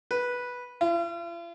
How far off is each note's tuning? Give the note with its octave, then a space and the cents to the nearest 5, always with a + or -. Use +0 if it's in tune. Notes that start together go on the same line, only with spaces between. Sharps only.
B4 -10
F4 -45